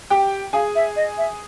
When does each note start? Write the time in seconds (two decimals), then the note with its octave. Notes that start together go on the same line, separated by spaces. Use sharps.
0.10 G4 G5
0.53 G#4 F5 G#5
0.75 E5
0.96 D#5
1.18 E5